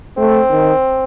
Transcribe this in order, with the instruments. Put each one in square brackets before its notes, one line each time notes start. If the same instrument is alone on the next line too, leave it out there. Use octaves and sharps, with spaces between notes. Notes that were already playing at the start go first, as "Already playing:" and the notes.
[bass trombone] A3 [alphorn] C4
[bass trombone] D#3